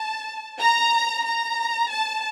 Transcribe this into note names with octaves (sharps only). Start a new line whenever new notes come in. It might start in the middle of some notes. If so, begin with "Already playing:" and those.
Already playing: A5
A#5
A#5
A5